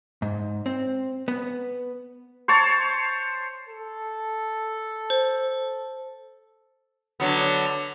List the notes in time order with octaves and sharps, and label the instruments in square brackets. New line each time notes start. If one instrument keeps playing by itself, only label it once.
[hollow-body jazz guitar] G#2
C4
B3
[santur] C5 C#5 A5
[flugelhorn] A4
[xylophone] C5
[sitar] D3 F#3 B3